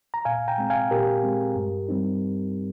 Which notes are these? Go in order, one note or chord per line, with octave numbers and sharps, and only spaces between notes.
A#5
A#2 F5 G#5
G5 A#5
G#3 C4
F5 G#5
A#2 G4 A#4
G#3 C4
G2
G3 C4 D#4